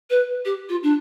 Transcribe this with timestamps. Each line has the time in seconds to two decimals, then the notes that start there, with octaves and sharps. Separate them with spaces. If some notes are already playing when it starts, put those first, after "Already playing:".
0.10 B4
0.45 G4
0.69 F4
0.83 D4